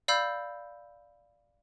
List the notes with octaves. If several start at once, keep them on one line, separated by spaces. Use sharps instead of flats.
D5 F5 B5 E6 G6